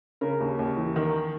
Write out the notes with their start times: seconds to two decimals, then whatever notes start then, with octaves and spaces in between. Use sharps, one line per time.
0.21 C#3 A#4
0.40 D#2
0.59 D#2
0.77 E3
0.96 D#3 A#4